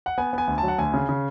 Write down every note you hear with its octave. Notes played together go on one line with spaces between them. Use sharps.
F#5
B3 G#5
B3 G#5
D2
A5
F#3
F#5
D2 G#5
C#3
C#3